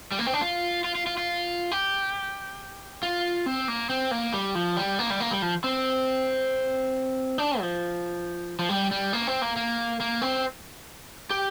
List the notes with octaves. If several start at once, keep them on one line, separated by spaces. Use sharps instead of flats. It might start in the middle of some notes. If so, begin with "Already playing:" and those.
G3
A#3
C4
D4
F4
F4
F4
F4
F4
G4
F4
C4
A#3
C4
A#3
G3
F3
G3
A#3
G3
A#3
G3
F3
C4
D4
F3
F3
G3
G3
A#3
C4
A#3
A#3
A#3
C4
G4